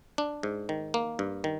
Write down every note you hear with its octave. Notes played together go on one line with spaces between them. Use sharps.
D4
G#2
D#3
A#3
G2
D#3